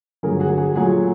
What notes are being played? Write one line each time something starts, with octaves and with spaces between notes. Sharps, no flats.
G2 D3 F#3 A3 G#4 A#4
F#4 G#4
F#4 G#4
A#2 F#3 A3 F#4 G#4